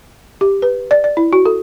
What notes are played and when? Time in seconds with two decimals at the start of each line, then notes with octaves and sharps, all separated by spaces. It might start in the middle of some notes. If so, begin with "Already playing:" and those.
0.41 G4
0.62 B4
0.91 D5
1.04 D5
1.17 E4
1.33 F#4
1.46 A4